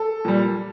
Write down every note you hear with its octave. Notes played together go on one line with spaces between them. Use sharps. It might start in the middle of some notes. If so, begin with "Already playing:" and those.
Already playing: A4
A#2 G3